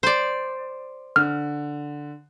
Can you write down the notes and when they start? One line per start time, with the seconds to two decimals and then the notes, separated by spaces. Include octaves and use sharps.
0.03 C5 D5
1.16 D3 F6